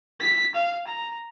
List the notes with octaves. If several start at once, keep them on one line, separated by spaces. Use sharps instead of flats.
B6
F5
A#5